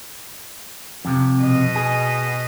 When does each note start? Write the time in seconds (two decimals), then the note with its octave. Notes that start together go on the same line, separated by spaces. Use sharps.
1.05 F2 C3
1.40 B2 D#5
1.76 G#4